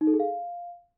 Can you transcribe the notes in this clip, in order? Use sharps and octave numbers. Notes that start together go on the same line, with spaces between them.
D#4
A4
G#4
F5